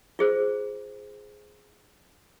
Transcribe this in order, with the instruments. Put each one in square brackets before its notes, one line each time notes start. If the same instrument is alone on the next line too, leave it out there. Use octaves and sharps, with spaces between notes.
[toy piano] F4 G#4 C5